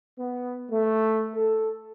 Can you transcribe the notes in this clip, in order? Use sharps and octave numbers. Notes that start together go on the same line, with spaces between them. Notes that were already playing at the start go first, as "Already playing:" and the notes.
B3
A3
A4